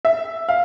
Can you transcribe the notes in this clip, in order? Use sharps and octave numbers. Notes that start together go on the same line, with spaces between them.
E5
F5